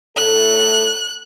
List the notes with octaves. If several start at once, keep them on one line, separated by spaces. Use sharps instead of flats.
A2 A4 F#6